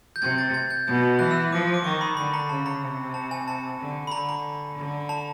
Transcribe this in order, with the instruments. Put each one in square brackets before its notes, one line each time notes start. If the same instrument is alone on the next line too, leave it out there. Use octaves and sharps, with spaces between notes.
[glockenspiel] G6
[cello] C3 [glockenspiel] G#6
[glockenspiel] A6
G#6
G6
[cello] B2
[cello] E3 [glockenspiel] F#6
[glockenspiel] E6
[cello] F3 [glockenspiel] D6
[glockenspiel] D6
[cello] D#3 [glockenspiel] C#6
[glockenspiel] B5
[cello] D3 [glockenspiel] B5
[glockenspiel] A#5
[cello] C#3 [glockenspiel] A5
[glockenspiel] A#5
[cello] C3
[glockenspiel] A5
G#5
A5
[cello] D3
[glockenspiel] B5
[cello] D3 [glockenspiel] A#5
[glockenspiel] A#5
[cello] D3
[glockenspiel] A5